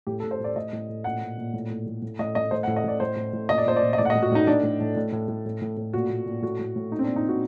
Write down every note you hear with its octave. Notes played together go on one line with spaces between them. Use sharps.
A2 G4
A4
A2
C5
A2 D5
A2 D#5
A2
A2
A#2 F#5
A#2
A#2
A2
A2
A2
A2
A2 D#5
A2 D#5
A2 C5
F#5
A2
D#5
A2 D5
A2 C5
A2
A2
A#2 D#5
D5
A#2 C5
D5
A#2
D#5
A2 D5
F#5
D#5
A2
F#4
A2 D#4
A2 D4
A2
A2
A2
A2
A2
A2
A2
A2
A#2 F#4
A#2
A#2
A2 F#4
A2
A2
A#2 D#4
C4
D4
A#2
D#4
A#2 F#4